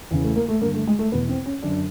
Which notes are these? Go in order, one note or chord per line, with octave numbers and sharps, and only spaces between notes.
E2 C#3 E3
A3
A#3
A3
G2 D3 A#3
A3
G#3
A3
E2 B2 B3
C4
C#4
F#2 D3 D4